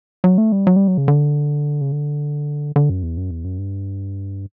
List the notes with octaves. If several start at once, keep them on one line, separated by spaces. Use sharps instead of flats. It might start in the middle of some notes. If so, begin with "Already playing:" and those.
F#3
A3
G3
F#3
G3
F#3
C#3
D3
C#3
D3
D3
F#2
E2
F#2
E2
F#2
G2